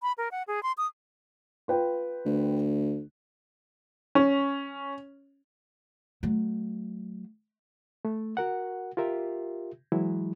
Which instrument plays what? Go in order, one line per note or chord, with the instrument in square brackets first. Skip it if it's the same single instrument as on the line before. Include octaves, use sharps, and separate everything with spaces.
[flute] B5
A#4
F#5
G#4
C6
D#6
[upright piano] F4 B4 G5
[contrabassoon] D2
[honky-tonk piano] C#4
[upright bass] F#3 A3
[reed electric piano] A3
F#4 A#4 F#5
F4 G4 A#4 E5
E3 F#3 G#3 E4